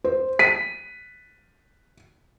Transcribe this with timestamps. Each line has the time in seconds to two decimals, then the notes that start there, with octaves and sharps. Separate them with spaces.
0.04 C5
0.39 B6 D#7